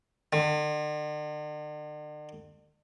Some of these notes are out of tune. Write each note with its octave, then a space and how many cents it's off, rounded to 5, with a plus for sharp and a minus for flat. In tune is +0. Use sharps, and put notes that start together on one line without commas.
D3 +45